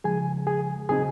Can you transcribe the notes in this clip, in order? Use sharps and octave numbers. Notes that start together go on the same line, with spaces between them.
C#3 F3 G#3 G#4 G#5
G#4 G#5
C#3 F#3 C4 D#4 G#4 G#5